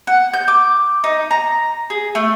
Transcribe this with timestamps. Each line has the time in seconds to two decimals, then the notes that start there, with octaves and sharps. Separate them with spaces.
0.07 F#5
0.34 G6
0.48 D6
1.04 D#4
1.31 A#5
1.90 G#4
2.15 A3